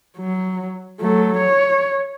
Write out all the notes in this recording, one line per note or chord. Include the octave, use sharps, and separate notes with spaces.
F#3
F#3 A3
C#5